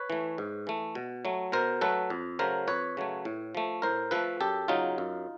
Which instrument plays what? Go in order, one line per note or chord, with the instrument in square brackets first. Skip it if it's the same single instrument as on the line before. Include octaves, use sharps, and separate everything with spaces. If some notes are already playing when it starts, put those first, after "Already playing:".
Already playing: [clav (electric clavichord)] B4 C#5
E3 A3
G#2
E3 A3
B2
F#3 A3
B2 A#4 C5
F#3 A3 A4 B4
F2
C#3 F#3 A3 A#4 C5
F2 B4 C#5
C#3 F#3 A3
A2
F3 A3
A2 A#4 C5
F3 A3 A4 B4
F#2 G4 A4
C#3 F#3 D#4 F4
F#2